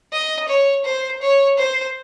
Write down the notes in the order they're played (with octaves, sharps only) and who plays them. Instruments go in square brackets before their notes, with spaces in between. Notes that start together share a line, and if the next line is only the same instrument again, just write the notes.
[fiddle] D#5
C#5
C5
C#5
C5